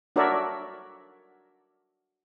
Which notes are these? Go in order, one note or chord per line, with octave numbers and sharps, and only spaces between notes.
D4 F#4 A#4 C#5 D5 E5